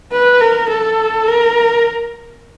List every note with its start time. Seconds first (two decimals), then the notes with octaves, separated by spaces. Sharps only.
0.12 B4
0.41 A#4
0.69 A4
1.28 A#4